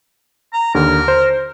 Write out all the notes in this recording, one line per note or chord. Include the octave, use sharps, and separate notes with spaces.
A#5
D#2 D3 A#4
C5